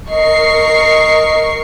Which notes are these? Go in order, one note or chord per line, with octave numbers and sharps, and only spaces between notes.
A#4 D#5 C#6 C7